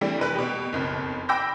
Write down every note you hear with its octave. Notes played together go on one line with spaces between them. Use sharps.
E3 G3 A3 C4 D4 E4
F1 A#4 B4 F#6
B2 G4
F#1 B1 F2
G5 B5 D6 E6 G6 A#6